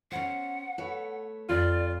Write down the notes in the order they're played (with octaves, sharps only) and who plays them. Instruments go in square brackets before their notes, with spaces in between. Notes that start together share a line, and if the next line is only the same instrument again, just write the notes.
[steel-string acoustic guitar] C#4 C5 [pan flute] F#5
[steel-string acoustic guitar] A3 B4 C#5
[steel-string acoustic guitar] F2 [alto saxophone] F4 [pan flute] D5